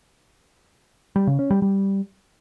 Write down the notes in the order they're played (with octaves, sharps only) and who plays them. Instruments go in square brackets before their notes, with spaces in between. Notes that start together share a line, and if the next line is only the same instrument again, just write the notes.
[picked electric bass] G3
C#3
C#4
G3
G3